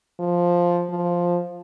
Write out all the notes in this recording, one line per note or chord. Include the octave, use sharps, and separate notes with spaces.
F3
F3